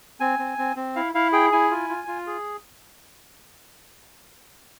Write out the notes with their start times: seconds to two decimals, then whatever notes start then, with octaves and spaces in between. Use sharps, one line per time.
0.20 C4 G#5
0.39 C4
0.58 C4
0.76 C4
0.96 E4 F5
1.15 E4 F5
1.32 G#4 G5
1.52 E4 G#5
1.71 F4
1.89 F4
2.07 F4
2.27 G#4